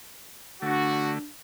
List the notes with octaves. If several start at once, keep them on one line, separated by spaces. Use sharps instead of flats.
D3 A3 D4 F#4